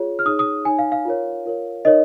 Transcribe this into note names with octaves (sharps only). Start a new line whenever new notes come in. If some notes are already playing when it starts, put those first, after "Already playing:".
Already playing: F4 G#4 C#5
F6
D#4 G#4 C#5 D#6
D#6
D#4 C#5 G#5
F5
F5
F4 A#4 C#5
F4 A#4 C#5
D#4 A#4 C#5 D#5